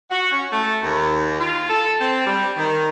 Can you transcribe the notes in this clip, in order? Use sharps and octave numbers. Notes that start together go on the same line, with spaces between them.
F#4
C#4
A3
D#2
F4
A4
C4
G3
D#3